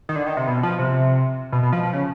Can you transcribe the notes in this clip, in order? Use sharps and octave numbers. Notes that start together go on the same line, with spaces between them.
D#3
D3
D#3
C3
B2
F3
C3
B2
B2
F3
F3
C#3